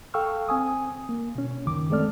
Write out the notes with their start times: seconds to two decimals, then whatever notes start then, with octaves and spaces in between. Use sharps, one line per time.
0.14 A4 F5 G5 C#6 E6 F6
0.48 C4 G#5 D#6
1.09 A#3
1.35 B2 C#4
1.66 C#2 F#2 D#3 D6
1.90 G#3 A3 C4 A4 D5 F6